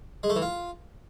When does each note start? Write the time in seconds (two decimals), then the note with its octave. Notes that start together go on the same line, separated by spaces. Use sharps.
0.23 G#3
0.30 A3
0.36 E3
0.42 F4